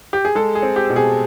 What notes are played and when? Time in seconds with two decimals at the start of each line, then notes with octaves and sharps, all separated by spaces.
0.13 G4
0.25 G#4
0.35 G#3 A4
0.55 G#4
0.62 C4
0.76 G4
0.90 B2
0.96 G#4